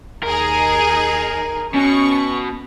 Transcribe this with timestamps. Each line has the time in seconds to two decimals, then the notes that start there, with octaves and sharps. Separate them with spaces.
0.23 D#2 D#4 G#4 A#4
1.74 B2 C#4 C#6